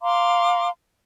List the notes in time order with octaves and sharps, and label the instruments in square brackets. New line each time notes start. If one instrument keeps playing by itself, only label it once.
[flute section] F5 A#5 C6 D6